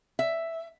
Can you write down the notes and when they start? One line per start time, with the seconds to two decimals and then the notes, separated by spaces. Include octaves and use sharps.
0.19 E5